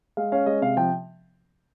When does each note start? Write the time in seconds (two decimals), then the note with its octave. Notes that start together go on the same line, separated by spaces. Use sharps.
0.17 G#3 F5
0.32 C#4 F5
0.46 G#3 D#5
0.62 C3 F5
0.77 F3 G5